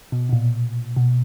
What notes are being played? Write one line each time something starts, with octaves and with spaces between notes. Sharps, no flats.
B2
B2
A#2
B2